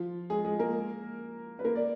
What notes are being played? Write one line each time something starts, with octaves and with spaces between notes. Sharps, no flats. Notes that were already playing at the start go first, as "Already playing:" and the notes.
Already playing: F3 F4
G#3 G#4
G#3 G#4
A#3 A#4
B4
A#3 A#4
D5